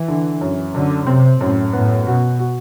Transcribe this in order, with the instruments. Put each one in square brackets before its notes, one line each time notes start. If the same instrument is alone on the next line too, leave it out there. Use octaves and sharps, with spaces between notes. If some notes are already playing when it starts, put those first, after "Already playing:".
Already playing: [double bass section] E3
[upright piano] D3
F#2
[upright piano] F#2 [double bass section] D3
[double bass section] C3 [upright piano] C4
[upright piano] F#2 [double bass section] A2
[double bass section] A2 [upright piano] B3
[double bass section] B2 [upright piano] F#4
[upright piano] F#4